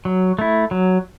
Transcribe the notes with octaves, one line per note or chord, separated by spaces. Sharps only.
F#3
A3 E4
F#3